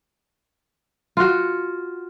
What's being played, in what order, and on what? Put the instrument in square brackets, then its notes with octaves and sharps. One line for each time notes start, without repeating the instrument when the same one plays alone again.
[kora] F4 F#4